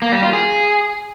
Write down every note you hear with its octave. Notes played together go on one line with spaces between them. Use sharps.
A#3
G3
F4
G#4